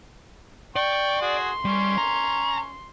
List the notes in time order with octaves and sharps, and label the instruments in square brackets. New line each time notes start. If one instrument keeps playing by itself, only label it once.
[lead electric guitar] D5 [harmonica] G5 C#6
[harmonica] F#4 G#4 [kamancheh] C6
[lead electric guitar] G3 [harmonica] C#4
[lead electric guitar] A#5